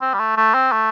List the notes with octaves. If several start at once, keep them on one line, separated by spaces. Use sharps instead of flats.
C4
G3
A3
A3
C4
A3